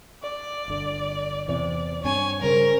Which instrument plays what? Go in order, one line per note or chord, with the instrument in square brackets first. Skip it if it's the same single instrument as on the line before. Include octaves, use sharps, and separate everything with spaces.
[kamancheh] D5
[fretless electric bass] G1 D3
[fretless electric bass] E2 C3 E3 [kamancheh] D5
[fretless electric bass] G2 C4 D4 [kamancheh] C#5 [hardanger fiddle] G#5
[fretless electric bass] C#3 G3 [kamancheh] C#4 C5 [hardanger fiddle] A#4